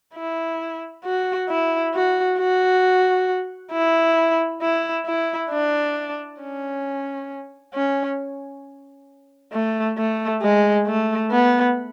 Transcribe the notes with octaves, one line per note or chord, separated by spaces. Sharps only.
E4
F#4
E4
F#4
F#4
E4
E4
E4
D4
C#4
C#4
A3
A3
G#3
A3
B3